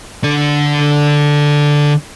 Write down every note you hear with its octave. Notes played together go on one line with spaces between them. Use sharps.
D3 D5